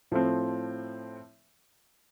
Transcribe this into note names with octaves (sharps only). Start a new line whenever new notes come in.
A2 F3 A3 C4